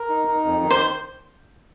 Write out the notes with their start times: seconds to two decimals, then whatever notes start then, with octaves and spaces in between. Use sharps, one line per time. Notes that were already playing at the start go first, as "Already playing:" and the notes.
Already playing: A#4
0.09 D#4
0.28 D#4
0.44 F2
0.63 D#3
0.70 C5